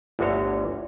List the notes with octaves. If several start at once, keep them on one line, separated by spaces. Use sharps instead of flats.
G1 D2 D3 F#4 C#5